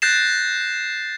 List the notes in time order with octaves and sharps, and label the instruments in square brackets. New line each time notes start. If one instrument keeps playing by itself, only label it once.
[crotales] F#6 G6 A6 A#6 C7 E7